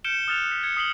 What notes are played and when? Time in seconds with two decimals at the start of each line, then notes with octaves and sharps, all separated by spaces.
0.04 F6 G6 C#7 D7 E7 G7
0.28 D#6 F6 F#6 A6 C#7 F7
0.51 B6
0.64 G#6 C#7
0.77 D#6 C7 F#7 G7